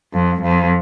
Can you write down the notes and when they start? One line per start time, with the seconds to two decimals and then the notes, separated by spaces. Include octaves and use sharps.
0.14 F2
0.42 F2